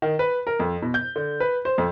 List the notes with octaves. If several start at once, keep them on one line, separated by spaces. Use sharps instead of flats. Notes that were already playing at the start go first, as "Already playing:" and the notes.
D#3
B4
A#4
F2
B2
G6
D3
B4
C5
F2